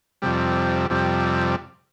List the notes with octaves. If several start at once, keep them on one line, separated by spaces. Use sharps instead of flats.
F2 C3 G3
F2 C3 G3